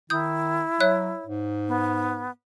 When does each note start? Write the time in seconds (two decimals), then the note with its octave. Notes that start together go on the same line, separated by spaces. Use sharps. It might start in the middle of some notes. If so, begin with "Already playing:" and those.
0.10 D#3 E4 D#6 G6
0.80 F#3 C#5 E5 F#6
1.27 G#2
1.68 B3